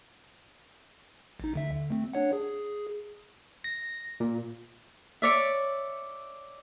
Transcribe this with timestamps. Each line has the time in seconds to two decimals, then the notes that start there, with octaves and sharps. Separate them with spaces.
1.40 A1 D#4
1.54 D2 D3 E5
1.72 D3
1.91 A3 C4
2.13 D4 C#5 F#5
2.33 G#4
3.64 A#6
4.20 A#2
5.22 C#5 D5 E5